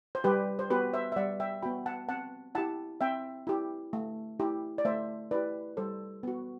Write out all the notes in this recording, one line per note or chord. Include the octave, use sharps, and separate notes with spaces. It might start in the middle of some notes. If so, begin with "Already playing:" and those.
C5
G3 G4 B4
C5
B3 F#4 G4 B4
C5 E5
E5
G3 D5 F#5
E5 G5
B3 F#4 G5 B5
F#5 A5
C4 F#5 A5
E4 G4 F#5 A5
C4 E5 G5
E4 G4
A3
E4 G4
D5
A3 C5 E5
E4 G4 B4 D5
G3 A4 C5
B3 F#4